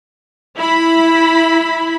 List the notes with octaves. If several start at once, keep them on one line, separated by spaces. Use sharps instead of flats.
E4 B5